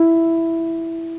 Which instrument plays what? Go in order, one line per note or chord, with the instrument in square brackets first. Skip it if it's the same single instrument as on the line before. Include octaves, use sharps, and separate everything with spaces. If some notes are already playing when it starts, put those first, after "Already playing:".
Already playing: [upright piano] E4